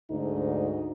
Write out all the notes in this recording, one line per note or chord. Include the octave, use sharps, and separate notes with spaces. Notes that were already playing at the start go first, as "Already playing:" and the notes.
D2 G#2 D#4